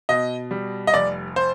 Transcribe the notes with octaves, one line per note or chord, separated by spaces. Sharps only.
B2 D#5
G3
D#5
F1 D5
C5